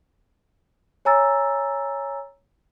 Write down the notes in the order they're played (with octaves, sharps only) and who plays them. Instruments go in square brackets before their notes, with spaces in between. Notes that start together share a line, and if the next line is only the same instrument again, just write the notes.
[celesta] C#5 G#5 A#5 E6 A6